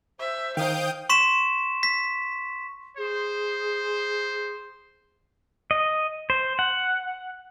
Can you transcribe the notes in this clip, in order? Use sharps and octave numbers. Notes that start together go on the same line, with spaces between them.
C5 E5
D#3 D#4 F5 G5 D#6 G6
C6 C#6 B6 E7
B6
G#4 C5
D#5
C5
F#5